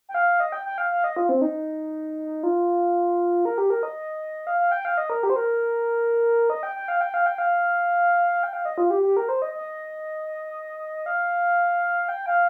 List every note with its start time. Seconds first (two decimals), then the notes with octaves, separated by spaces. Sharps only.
0.09 G5
0.14 F5
0.40 D#5
0.52 G5
0.66 G5
0.78 F5
0.91 F5
1.04 D#5
1.17 F4
1.29 C4
1.42 D#4
2.43 F4
3.45 A#4
3.58 G4
3.70 A#4
3.83 D#5
4.47 F5
4.59 F5
4.72 G5
4.85 F5
4.97 D#5
5.10 A#4
5.23 G4
5.30 C5
5.36 A#4
6.50 D#5
6.63 G5
6.76 G5
6.88 F5
7.01 G5
7.14 F5
7.26 G5
7.38 F5
8.43 G5
8.53 F5
8.65 D#5
8.78 F4
8.90 G4
9.03 G4
9.17 A#4
9.29 C5
9.42 D#5
9.54 D#5
11.06 F5
12.09 G5
12.26 F5